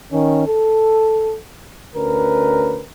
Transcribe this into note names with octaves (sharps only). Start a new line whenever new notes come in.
D#3 C#4
A4
D2 C#4 A#4 B4